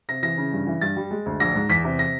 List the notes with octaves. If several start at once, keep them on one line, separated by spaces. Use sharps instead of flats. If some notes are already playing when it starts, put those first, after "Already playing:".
C3 A#6
E3 A#6
C#3
G2
E3
G2 A6
G3
G#3
D2
A#1 A#6
G#2
E2 B6
C3
A#6